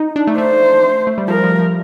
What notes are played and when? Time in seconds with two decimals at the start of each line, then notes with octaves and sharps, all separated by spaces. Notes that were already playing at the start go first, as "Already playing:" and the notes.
Already playing: D#4
0.16 D4
0.27 A3
0.38 A3 C5
1.07 A3
1.18 G3
1.28 F3 A#4
1.44 F3
1.59 F3